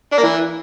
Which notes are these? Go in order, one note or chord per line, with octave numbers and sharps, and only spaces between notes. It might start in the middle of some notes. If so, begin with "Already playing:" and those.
D4
A#3
E3